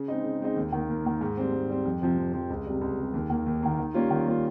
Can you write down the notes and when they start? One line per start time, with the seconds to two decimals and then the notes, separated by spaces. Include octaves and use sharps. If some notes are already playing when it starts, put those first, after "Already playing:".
Already playing: C#3
0.08 G#3 C4 D#4
0.24 C#3
0.41 G#3 C4 D#4
0.56 D#2
0.72 D#3 A#3
0.89 D#2
1.05 D#3 A#3
1.21 G#2
1.37 G3 C4
1.53 G#2
1.69 G3 C4
1.85 F2
2.01 C3 F3 C4
2.18 F2
2.33 C3 F3 C4
2.50 C#2
2.66 C3 G3
2.81 C#2
2.97 C3 G3
3.14 D#2
3.30 D#3 A#3
3.46 D#2
3.63 D#3 A#3
3.79 D#3
3.94 G3 A#3 C#4 F4
4.10 D#3
4.26 G3 A#3 C#4 F4